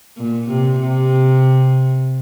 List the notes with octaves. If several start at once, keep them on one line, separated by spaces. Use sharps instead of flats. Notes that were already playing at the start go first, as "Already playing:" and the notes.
A#2
C3
C3